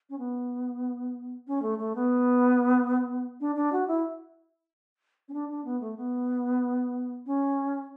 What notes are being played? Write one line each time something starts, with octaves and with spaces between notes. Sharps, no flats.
C#4
B3
C#4
A3
A3
B3
D4
D4
F#4
E4
C#4
D4
D4
B3
A3
B3
C#4